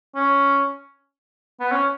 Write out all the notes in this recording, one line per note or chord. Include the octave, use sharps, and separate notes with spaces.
C#4
B3
C#4